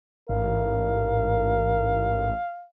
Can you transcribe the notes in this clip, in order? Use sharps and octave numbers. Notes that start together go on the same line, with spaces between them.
A1 G#2 A#4 F5